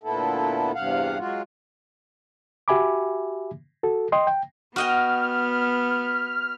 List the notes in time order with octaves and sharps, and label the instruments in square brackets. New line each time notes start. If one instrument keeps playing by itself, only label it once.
[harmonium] D2 A#2 B3 E4 A4
E2 G2 C3 F5 F#5
F#3 G#3 F4 F#4
[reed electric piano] F#4 G4 E5 G#5 B5 D6
F#4 A4
D#5 G5 C6
G5
[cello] B3 [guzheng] F#4 D#5 G5 [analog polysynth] F6